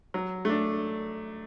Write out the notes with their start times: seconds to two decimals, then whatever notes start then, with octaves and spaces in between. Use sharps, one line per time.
0.14 F#3
0.45 A3 D4